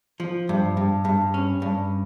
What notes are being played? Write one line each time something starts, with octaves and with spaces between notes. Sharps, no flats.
F3
G2
G2
G2
C#4
G2